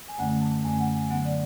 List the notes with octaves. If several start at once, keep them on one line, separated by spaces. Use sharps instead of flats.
G#5
F#2 D3 A3 C#4 F#5
A5
F#2 D3 A3 C#4 G#5
F#5
G#5
D3 F#3 B3 F#5
D5